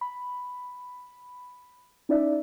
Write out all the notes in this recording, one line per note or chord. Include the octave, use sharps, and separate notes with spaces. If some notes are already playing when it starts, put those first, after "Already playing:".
B5
C#4 D#4 E4 D5 E5